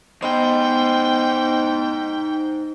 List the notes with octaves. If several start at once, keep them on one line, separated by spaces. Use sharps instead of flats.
B3 D#4 C5 D#5 G5 C6